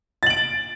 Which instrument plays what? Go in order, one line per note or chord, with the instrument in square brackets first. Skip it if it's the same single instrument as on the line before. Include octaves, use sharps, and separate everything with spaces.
[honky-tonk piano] A6
F#7
D7